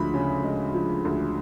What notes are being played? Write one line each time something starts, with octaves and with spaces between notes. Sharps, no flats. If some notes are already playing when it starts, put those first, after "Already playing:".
Already playing: D2 F3 G#3 B5
C#3
G#3
F3
D2